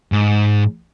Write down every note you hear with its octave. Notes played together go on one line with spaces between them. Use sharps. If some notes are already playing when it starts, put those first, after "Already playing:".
G#2